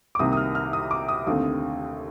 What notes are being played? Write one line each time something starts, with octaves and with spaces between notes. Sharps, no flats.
D6
C2 C3 D#3 A#3 D#6
D#6
F6
F6
D#6
D6
D#6
D#2 D3 A3 C4 D#6